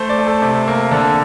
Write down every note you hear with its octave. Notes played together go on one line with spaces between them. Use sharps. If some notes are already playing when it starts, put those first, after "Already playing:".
Already playing: A3 C5
D5
A3
A4
C3
A#3
D3 A4